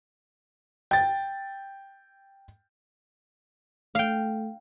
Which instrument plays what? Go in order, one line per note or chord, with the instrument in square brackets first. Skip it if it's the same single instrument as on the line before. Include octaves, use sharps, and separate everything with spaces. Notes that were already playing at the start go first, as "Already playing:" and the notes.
[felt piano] G5 A6
[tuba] A3 [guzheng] F5 G5